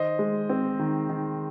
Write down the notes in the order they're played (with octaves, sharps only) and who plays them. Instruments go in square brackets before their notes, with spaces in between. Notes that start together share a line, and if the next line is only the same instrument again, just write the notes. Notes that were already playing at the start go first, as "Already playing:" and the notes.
Already playing: [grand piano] D#3 C5 D#5
G#3
C4
D#3
D#3